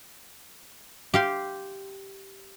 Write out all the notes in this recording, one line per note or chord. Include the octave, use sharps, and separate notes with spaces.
G4 F5 C6